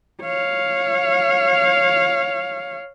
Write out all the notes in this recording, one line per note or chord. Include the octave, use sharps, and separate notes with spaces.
C#5 F5